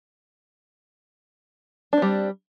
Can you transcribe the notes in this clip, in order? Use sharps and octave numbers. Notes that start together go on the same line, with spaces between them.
G3 C4 D4